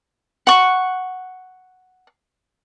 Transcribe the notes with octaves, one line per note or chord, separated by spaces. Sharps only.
F#5 C#6